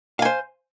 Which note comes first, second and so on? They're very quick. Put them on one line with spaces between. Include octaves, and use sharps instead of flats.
F5 G#5 C5